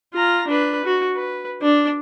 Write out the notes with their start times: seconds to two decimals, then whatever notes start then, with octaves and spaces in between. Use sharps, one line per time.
0.14 F4 A#5
0.48 D4 B4
0.85 F#4
1.15 B4
1.62 D4